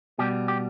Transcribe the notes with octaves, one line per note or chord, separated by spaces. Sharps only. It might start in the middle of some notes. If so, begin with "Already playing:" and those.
B2 G3 G4
G4